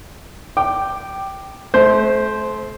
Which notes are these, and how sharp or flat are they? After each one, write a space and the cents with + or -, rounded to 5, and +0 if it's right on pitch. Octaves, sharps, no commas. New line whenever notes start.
G5 -10 D6 +15
A3 -35 C5 +0